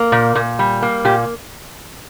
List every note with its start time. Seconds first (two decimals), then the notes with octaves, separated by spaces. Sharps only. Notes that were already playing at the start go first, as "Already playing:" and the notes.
Already playing: A#3
0.12 A#2
0.35 A#2
0.59 G3
0.83 A#3
1.05 A#2 G4